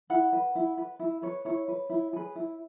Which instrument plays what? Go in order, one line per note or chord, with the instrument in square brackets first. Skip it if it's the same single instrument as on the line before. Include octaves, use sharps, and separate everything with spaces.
[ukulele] E4 F#5
B4
E4
B4
E4
B4 C#5
E4 C#5
B4
E4
G#4 B4
E4